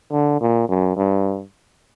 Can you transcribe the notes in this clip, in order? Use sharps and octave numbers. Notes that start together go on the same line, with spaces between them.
D3
A#2
F#2
G2